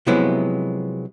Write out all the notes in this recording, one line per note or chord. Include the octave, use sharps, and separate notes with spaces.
C3 F3 F#3 G#3 B3 E4